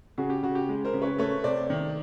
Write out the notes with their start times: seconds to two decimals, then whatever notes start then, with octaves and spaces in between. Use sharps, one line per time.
0.18 C#3 F#4 G#4
0.30 G4
0.43 C#3 F#4
0.55 G4
0.69 G#3
0.85 A#4 C5
0.94 C#3
1.02 B4 C#5
1.18 A3 B4 C#5
1.44 C3 C5 D5
1.70 D#3